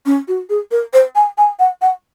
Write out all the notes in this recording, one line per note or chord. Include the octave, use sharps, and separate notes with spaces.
C#4
F#4
G#4
A#4
C5
G#5
G#5
F#5
F#5